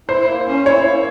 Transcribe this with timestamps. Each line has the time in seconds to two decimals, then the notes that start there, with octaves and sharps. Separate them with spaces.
0.08 E4 C5
0.27 A#3
0.47 C#4
0.66 E4 C#5
0.85 A#3